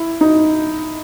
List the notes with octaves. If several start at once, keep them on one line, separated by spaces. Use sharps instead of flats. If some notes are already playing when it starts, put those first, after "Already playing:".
Already playing: E4
D#4